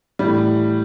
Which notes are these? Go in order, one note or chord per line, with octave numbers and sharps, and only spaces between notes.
A2 E3 G3